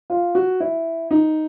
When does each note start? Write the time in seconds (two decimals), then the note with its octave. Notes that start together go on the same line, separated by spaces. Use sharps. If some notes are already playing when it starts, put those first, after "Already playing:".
0.10 F4
0.35 F#4
0.60 E4
1.11 D#4